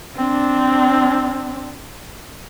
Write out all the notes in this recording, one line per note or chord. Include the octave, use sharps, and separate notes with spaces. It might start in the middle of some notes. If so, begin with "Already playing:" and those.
C4 D4